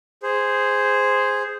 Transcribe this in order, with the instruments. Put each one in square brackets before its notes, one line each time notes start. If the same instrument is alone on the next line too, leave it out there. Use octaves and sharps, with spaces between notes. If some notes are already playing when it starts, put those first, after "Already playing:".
[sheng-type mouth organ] G#4 C5